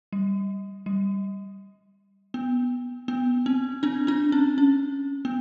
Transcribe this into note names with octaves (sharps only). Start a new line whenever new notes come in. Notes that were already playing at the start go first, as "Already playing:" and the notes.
G3
G3
B3
B3
C4
C4 D4
C4 D4
C#4
C#4
B3